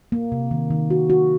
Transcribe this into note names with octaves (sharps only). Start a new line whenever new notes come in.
A#3
C3
D#3
D#3
F#4
F#4